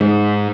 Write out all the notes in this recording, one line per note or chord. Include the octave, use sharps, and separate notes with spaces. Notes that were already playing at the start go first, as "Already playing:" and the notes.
G#2